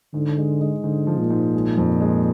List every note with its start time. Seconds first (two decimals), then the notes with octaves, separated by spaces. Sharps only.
0.14 G#2 D3
0.37 G#3
0.61 G#3
0.84 G#2 D3
1.07 F3
1.19 A#2
1.30 G#2
1.54 G#3
1.78 F2
2.01 G#3